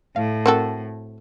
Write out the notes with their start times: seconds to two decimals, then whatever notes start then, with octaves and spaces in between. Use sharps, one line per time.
0.16 A2 F5
0.46 C4 F#4 A4 A#4 G5